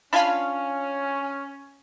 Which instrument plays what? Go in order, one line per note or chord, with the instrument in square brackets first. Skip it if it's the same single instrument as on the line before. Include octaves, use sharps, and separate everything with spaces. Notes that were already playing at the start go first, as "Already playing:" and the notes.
[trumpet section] C#4 [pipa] D4 F4 G#5 [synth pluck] F5 B5